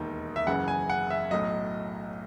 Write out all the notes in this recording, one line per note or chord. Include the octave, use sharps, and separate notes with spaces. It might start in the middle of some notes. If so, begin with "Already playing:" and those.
Already playing: E1 D#2 D#3
E5
F#1 F#2 C#3 E3 F#5
G#5
F#5
E5
B1 A2 F#3 D#5